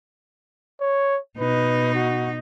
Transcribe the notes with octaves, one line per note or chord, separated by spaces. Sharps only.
C#5
B2 D#4 B4
F#4